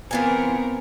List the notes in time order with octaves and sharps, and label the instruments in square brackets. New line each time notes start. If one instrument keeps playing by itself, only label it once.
[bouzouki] E3 F4 G#5 [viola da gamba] B3 C4 A#4